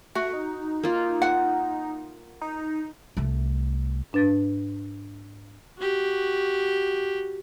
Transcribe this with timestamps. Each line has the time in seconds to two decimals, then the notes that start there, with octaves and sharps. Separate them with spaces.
0.15 A3 F#4
0.33 D#4
0.83 A#3 F4
1.22 F#5
2.41 D#4
3.17 C2 A3
4.13 G#2 D4 B4 A6
5.79 F#4 G4